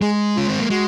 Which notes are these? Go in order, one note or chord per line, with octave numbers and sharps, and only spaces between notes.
G#3 G#4
C#4 F4
C4
A#3
G#3 F#4